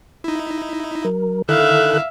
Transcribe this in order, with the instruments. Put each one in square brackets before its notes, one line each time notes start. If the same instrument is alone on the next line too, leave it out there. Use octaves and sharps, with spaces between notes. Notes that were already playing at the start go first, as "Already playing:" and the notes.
[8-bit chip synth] D#4 E4
[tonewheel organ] F#3 A#4
[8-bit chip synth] D3 D#3 E4 [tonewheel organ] A4 F#6 [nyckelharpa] E5 F5